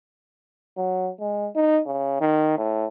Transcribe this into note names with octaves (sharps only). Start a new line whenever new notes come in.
F#3
G#3
D#4
C#3
D#3
A2